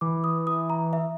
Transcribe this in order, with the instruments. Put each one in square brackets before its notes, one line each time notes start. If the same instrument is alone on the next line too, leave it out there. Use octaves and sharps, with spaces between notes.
[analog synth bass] E3 [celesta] D6
[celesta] D#6
D#6
A#5
E5